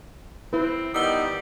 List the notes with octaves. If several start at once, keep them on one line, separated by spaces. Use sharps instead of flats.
C4 E4 B4
D#3 G3 B3 D#4 D#6 E6 G7